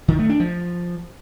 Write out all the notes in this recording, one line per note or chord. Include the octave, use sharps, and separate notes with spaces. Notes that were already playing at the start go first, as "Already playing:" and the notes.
D#3
A3
D4
F3